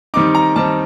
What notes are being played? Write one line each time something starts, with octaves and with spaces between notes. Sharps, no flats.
D#3 G3 C4 D#4 D6
A#5
D#3 G3 C4 D#4 A5